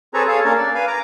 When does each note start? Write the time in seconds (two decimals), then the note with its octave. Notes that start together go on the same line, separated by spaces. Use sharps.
0.14 C4 G#4 A4 B4 C#5 A#5
0.28 G#4 A4 C#5 F5
0.45 A#3 C#4 D4 A#4
0.57 D5
0.75 B4 F5 G#5
0.87 A#5 D6